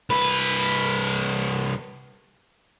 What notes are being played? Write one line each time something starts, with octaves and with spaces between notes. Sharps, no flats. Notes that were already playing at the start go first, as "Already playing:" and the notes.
C2 B4